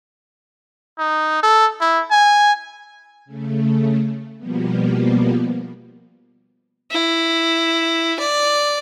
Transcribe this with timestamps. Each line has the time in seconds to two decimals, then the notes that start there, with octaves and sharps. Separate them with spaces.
0.99 D#4
1.43 A4
1.81 E4
2.11 G#5
3.25 C#3 A3
4.38 B2 F3 G3 A#3 B3
6.91 E4
8.19 D5